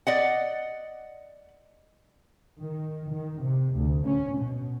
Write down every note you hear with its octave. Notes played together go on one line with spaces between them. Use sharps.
D5 D#5 F#5
D#3
D#3
C3
D2
C#4
B2